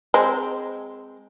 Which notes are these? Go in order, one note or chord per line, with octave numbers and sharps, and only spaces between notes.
G#3 C4